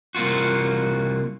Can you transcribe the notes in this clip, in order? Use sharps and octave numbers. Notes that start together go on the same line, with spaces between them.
C2 A#3 F4 F#4